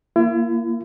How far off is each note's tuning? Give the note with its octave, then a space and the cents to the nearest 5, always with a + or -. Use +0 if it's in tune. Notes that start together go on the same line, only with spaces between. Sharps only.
A#3 +5 E4 +40